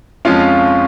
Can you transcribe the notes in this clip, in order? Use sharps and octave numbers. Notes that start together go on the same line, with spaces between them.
F2 F3 G#3 C#4 F4 F5